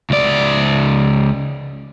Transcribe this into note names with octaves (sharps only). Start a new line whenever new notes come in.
C#2 D5